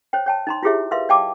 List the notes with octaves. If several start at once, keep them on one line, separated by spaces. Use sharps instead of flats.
C5 C#5 G5
C#5 G5 A5
D#4 A#5 C6
E4 F4 G4 G#4 C#5 E5
A#4 B4 E5 F5 C6
D5 F5 G5 A5 D6